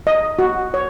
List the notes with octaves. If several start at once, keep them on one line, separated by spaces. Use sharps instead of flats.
D#5
F#4
C#5